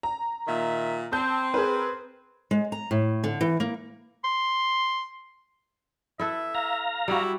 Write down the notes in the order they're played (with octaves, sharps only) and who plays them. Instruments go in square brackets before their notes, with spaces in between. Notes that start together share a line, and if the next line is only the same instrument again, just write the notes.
[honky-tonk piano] A#5
[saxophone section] A#2 D#3 E5
[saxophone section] C4 [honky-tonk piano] A5 G6
[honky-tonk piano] G#4 A#4 B4
[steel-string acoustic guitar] G#3
A#5
A2
D3
E3
A#3
[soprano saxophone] C6
[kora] E4 A4 B4 [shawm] E5
[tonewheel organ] F5 A#5
[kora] G3 F#4 [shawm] E4